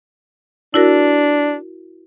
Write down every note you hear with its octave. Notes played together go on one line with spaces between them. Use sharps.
D4 E4 F#4 A#4